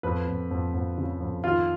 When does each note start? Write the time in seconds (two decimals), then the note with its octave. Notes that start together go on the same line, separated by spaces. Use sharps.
0.03 F2 B4
0.28 F2
0.51 F2
0.74 F2
0.98 C#3
1.20 F2
1.44 D#3 F4